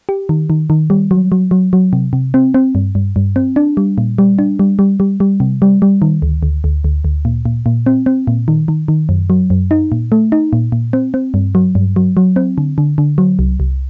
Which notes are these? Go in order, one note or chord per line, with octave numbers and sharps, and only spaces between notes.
G4
D#3
D#3
D#3
G3
F#3
F#3
F#3
F#3
C3
C3
C4
C4
G2
G2
G2
C4
D4
G3
A#2
G3
D4
G3
G3
G3
G3
C3
G3
G3
D#3
D2
D2
D2
D2
D2
A#2
A#2
A#2
C4
C4
A#2
D#3
D#3
D#3
F#2
F#3
F#2
D#4
A#2
A3
D#4
A#2
A#2
C4
C4
G2
F#3
G2
F#3
F#3
C4
D3
D3
D3
F#3
C2
C2